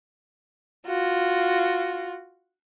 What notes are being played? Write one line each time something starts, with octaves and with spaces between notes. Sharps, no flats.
F4 F#4